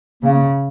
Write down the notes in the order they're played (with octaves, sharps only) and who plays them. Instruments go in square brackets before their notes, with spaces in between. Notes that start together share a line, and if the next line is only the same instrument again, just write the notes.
[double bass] C#3 [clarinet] A#3